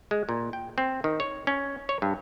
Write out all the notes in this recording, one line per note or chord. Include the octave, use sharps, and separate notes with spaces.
G#3
A#2
G5
C4
D#3
C#5
C#4
C#5
G2